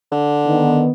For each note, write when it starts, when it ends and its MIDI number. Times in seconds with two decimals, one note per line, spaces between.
0.12 0.85 50
0.47 0.91 51
0.47 0.91 59